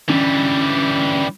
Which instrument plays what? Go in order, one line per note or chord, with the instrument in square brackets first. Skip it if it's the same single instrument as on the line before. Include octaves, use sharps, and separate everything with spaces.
[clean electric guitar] D3 C#4 [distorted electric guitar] E3 G3